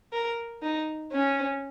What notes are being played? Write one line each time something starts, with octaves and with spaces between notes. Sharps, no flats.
A#4
D#4
C#4